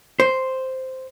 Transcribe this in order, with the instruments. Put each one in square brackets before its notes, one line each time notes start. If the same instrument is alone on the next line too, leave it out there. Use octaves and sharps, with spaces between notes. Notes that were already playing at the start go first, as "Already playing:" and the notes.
[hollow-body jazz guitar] C5